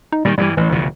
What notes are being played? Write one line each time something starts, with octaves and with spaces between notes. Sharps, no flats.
D#4
A#2 D#3 G3
G2 D3 E3 G3
A1 E3
F1 D2 B2